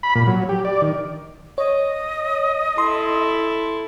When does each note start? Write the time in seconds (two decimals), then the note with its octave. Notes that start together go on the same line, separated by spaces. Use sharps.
0.03 B5
0.15 A#2
0.27 F#3
0.49 G4
0.65 D5
0.82 D#3
1.58 C#5 D#5
2.78 E4 A4 C6